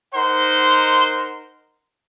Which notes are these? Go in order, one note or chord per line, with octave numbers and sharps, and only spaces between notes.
D#4 A#4 C5 F#5 C6